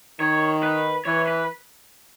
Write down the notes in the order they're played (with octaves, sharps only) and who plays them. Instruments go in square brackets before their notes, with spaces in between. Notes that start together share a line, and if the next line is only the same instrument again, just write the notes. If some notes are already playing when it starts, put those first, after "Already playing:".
[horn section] D#3 [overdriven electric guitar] C#5
[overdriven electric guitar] B4
[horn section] E3 [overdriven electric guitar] C#5
[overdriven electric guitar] B4